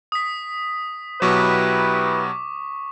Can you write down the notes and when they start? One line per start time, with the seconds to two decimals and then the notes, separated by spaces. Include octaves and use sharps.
0.12 D#6 B6
1.22 B2 F#3 E4 G4 B4 C#6 D6